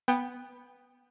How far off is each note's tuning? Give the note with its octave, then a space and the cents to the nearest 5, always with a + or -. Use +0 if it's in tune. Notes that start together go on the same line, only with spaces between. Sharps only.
B3 +0 G5 +20